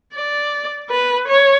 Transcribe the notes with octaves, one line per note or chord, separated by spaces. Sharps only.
D5
B4
C#5